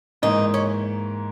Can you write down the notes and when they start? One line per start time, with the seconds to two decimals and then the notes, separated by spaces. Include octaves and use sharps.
0.22 G#2 E3 A#3 D#4
0.54 C#4